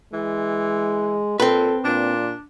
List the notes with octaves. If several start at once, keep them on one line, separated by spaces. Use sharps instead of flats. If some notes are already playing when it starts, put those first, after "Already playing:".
E3 G#3
A#2 C4 A4 B4
A#2 D4